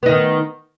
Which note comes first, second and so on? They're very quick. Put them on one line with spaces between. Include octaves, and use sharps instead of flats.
B3 D#4 D#3